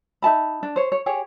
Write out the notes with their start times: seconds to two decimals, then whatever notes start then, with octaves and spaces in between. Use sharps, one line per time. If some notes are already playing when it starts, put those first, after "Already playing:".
0.22 D#4 E5 A5 B5
0.63 D4
0.76 C5 C#5
0.92 C#5
1.06 G4 G#4 C#5